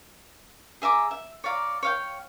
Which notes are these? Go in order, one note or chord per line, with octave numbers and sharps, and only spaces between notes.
G#4 E5 A#5 D6
E5
C#5 D5 F5 A#5
C#5 F5 G5